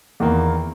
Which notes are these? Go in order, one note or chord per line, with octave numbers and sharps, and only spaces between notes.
E2 D#3 A#3